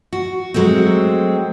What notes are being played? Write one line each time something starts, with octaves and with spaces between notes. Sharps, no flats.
F#4
F#3 G#3 A3 C4